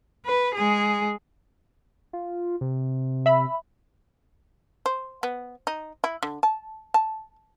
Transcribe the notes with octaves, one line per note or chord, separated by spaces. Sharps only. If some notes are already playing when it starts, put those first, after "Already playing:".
B4
G#3 G#4
F4
C3
E5 B5
C5
B3
D#4
E4
D3
A5
A5